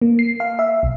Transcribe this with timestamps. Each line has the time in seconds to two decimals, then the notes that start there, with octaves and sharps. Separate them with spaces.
0.02 A#3
0.19 C7
0.40 F5
0.59 E5
0.83 B1